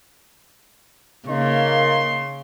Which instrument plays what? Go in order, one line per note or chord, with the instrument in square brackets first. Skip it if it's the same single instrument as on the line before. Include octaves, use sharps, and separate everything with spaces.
[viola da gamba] C#3 [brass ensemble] A#3 [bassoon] D#4 [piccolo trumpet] C6